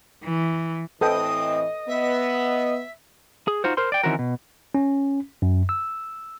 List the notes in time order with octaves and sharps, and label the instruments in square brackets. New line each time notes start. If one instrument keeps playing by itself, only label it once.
[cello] E3
[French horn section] A2 E3 C4 [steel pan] A4 B4 G5 [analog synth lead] D#5 [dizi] D#6
[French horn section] B3 [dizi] E5
[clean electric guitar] G#4
D#4 F4 F#4 C5
A#4 C5 C6
D5 G5
D#3 E3 C4 C#4 F#4 A#4
B2
[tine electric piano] C#4
F#2
E6